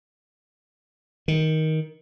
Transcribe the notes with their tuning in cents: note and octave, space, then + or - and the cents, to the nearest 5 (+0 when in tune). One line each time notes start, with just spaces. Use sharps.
D#3 +15